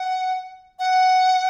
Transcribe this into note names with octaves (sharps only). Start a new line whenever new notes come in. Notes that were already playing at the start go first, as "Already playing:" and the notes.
Already playing: F#5
F#5